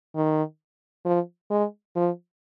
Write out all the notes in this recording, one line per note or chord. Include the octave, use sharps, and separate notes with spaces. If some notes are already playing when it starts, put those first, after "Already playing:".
D#3
F3
G#3
F3